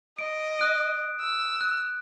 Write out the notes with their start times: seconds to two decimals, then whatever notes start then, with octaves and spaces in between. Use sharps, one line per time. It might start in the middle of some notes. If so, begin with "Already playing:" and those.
0.19 D#5 D7
0.59 D#6 F#6 D7
1.21 E6
1.61 F#6